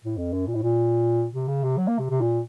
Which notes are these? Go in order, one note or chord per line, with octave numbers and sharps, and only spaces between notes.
A2
F2
F#2
A#2
A2
A#2
C3
C#3
C3
F#3
A#3
C3
C3
A#2